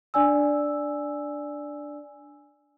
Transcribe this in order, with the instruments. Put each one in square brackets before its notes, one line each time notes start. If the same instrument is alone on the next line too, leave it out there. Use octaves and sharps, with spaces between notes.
[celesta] D4 D5 G#5 E6